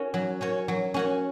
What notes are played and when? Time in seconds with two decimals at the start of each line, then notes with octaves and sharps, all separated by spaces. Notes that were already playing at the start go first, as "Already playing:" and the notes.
Already playing: C#4 F#4 C#5
0.14 F#3
0.41 C#4 F#4 C#5
0.68 F#3
0.94 C#4 F#4 C#5